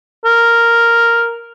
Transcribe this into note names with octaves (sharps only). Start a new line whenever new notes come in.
A#4